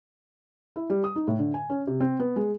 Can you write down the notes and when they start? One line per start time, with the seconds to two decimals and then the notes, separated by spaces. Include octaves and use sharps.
0.76 E4
0.90 G3
1.04 D#6
1.16 D#4
1.28 A2
1.39 D3
1.54 G#5
1.70 C#4
1.87 C3
2.00 C4
2.19 B3
2.36 G#3